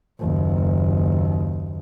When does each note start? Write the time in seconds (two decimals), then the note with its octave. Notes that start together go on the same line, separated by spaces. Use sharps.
0.20 F#1 D#2